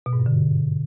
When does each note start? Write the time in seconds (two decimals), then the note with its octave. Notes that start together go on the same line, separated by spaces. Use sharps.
0.06 B2
0.13 G#2
0.20 G2
0.26 D3